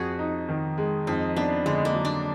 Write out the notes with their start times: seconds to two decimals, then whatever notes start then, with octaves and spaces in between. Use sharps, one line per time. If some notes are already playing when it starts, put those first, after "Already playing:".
Already playing: F2 F#4 G#4
0.19 D#4
0.49 D#3
0.78 G#3
1.07 F2 D#4
1.36 B3 D4
1.66 D3 G#3
1.85 A#3
1.95 F#3
2.05 D4